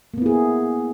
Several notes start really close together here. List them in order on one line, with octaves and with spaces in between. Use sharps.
A#3 B3 E4 G#4